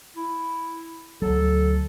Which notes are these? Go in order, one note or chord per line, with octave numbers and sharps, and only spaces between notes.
E4
D2 F#3 A4